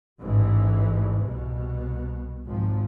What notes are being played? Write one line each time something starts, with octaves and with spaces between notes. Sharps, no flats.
A1 G#2 E3
C2 B2
G#1 F3